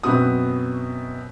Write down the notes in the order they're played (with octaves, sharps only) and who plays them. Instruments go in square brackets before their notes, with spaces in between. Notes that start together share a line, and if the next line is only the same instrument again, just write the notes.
[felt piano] F#2 B2 B3 C4 F#4 D#6